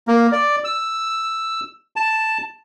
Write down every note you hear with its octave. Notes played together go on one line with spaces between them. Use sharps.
A#3
D5
E6
A5